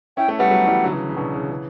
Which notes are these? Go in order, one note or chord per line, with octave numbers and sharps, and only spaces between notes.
C#4 E4 G5
A3 C#4
G3 B3 F#5
F#3 A3
E3 G3
D3 F#3
C#3 E3
C#3
B2 D3
C#3 E3
C#3 E3